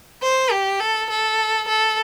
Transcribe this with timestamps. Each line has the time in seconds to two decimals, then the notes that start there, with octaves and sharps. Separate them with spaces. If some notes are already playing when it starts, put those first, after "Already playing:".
0.22 C5
0.51 G4
0.80 A4
1.10 A4
1.68 A4